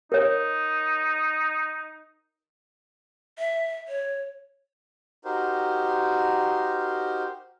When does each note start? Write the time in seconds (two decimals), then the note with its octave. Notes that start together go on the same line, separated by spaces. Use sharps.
0.12 D#4 A#4 C#5
3.39 E5
3.88 C#5
5.25 D#4 F#4 G4 A#4 C5